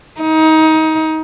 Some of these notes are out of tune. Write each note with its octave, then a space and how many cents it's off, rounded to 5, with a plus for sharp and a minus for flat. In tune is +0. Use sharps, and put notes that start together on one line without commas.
D#4 +25